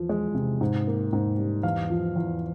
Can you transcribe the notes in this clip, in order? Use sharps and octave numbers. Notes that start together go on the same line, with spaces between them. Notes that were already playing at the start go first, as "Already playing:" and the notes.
Already playing: E2 F3
G#3
C3
G#2
A#3
G#2
G3
E2 F5
F3
E2